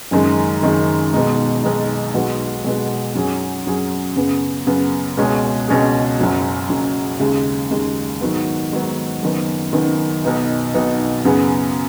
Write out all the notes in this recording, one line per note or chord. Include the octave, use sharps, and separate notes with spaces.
F#1 F#2 D#3 G#3
F#1 F#2 D#3 G#3
B1 B2 G#3 D#4
B1 B2 G#3 D#4
B1 B2 G#3 B3 F#4
B1 B2 G#3 B3 F#4
F#2 F#3 C#4 G#4
F#2 F#3 C#4 G#4
F#2 C#3 B3
F#2 C#3 B3
C#2 B2 G#3 C#4 G#4
C#2 B2 G#3 C#4 G#4
F#1 F#2 F#3
F#1 F#2 F#3
D#2 C#3 G#3
D#2 C#3 G#3
G#2 D#3 F#3 B3
G#2 D#3 F#3 B3
F#1 F#2 D#3 B3
F#1 F#2 D#3 B3
B1 B2 B3 D#4
B1 B2 B3 D#4
F#2 C#3 B3 G#4